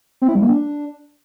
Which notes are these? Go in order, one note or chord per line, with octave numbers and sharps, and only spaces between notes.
C4
E4
G3
A#3
D4